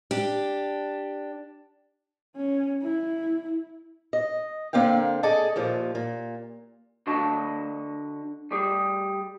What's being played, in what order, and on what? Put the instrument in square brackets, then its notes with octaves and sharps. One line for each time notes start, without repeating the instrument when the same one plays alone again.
[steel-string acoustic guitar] D4 G4
[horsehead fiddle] C#4
E4
[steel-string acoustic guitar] D#5
D3 A#3 C4 F5 G5
G#4 A4 D5 D#5 A5
D#2 A#2 F3
A#2
[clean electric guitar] D3 D4 F#4 D#5 A5
G3 G4 G#4